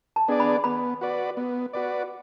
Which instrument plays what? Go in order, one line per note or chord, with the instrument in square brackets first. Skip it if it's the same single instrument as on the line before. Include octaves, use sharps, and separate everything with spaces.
[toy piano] A5
[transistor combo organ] B3 D4 G#4 D5
[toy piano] B5
[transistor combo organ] B3 [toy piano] B5
[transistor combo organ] F#4 B4 D5
B3
F#4 B4 D5